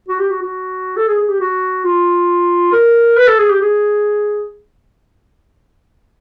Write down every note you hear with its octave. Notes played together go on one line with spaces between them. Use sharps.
F#4
G4
F#4
F#4
A4
G#4
G#4
G4
F#4
F4
A#4
B4
A4
G#4
G4
G#4